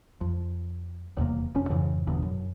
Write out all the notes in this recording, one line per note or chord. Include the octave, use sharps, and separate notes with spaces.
F2
D#1 E2 C3 A#3
F1 C#4
F2 G#2 C#3 E3
G1 E2 B2 D3
F#2